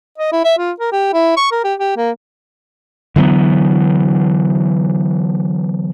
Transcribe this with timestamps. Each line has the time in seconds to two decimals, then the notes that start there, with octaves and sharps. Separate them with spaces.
0.18 D#5
0.32 E4
0.45 E5
0.58 F4
0.80 A#4
0.92 G4
1.13 E4
1.37 C#6
1.52 A#4
1.64 G4
1.80 G4
1.97 A#3
3.16 D3 E3 F#3 B3